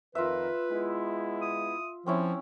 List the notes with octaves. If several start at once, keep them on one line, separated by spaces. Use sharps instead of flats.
F2 D#3 F4 A#4 B4 E5
G#3 B3 E4
D#6
F3 C4 C#4 E4